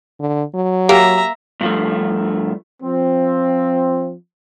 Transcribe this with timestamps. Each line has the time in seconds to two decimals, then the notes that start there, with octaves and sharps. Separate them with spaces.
0.20 D3
0.55 F#3
0.89 A#3 G4 E5 A#5
1.61 G2 F3 A3
2.83 F3 C4